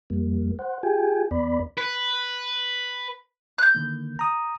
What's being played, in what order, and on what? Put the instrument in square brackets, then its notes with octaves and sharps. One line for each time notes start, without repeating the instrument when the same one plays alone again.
[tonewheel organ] F2 G3 A#3
C5 F#5
F4 G4 G#4 G5 G#5
E2 B3 D5 B5
[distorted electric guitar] B4
[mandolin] F#6 G6
[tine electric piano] D3 D#3 A#3
A#5 D#6